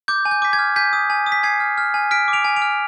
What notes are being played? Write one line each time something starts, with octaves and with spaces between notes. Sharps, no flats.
D6 G6
G#5
G6
D6 B6
G#6
F6
G#5 G6 B6
D#6
G#5
D#6
B6
G#5 G#6 C7
F6
F6
G#5
F6 B6 D7
D6
D7 F7
G#5
D7 F7
F6